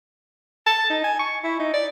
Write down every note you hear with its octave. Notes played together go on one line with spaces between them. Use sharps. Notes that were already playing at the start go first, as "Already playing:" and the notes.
A5
D#4
G#5
C#6
E4
D#4
D5